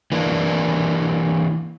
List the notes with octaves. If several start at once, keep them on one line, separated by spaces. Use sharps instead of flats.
E3 A#3 D4